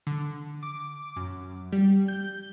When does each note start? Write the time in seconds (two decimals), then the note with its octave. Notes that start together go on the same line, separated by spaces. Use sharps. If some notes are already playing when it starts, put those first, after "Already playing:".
0.07 D3
0.63 D6
1.16 F#2
1.72 G3
2.08 G6